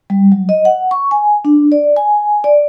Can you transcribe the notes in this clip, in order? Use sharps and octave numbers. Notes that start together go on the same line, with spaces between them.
G3
F#3
D#5
F#5
C#6
G#5
D4
D5
G#5
D5